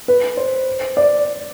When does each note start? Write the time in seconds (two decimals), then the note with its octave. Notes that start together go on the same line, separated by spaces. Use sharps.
0.08 B4
0.37 C5
0.97 D5